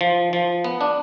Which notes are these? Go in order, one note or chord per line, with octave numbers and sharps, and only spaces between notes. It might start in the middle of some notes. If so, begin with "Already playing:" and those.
F3
F3
B3
D4